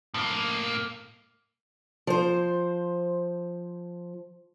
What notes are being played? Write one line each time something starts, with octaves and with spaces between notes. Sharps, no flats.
A2 A#3
F3 C5